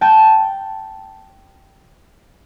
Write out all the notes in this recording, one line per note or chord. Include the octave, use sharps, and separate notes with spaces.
G5 A5 G6